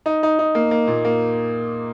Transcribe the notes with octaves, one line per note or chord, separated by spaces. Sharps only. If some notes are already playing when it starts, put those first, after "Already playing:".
D#4
D#4
D#4
A#3
A#3
A#2
A#3